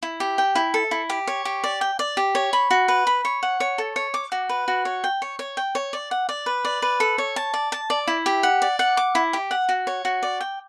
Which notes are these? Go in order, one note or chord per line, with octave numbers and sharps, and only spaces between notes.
E4
G4
G5
E4
A4
E4
G4
C#5
G4
D5
G5
D5
G4
C#5
B5
F#4
B4
B5
C#5
F#5
C#5
A4
C#5
D6
F#4
B4
F#4
C#5
G5
C#5
C#5
G5
C#5
D5
F#5
D5
B4
D5
B4
A4
C#5
A5
D5
A5
D5
E4
G4
F#5
D5
F#5
D6
E4
G4
F#5
F#4
C#5
F#4
D5
G5